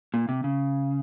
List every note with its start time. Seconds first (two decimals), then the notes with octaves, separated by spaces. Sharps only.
0.14 A#2
0.29 C3
0.44 C#3